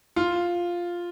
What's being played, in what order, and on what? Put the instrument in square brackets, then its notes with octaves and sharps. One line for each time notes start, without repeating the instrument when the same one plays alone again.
[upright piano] F4